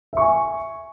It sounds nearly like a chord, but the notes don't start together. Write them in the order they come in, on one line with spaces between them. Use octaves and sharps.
E5 C#6 G#5